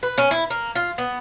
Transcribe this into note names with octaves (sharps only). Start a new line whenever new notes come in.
B4
C#4
E4
A#3
F4
B3